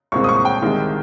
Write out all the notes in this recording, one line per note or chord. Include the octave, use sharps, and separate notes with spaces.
C2 A#2 G#3 C4 C#6
D#6
C#6
G5
C2 C3 D#3 G#3 C4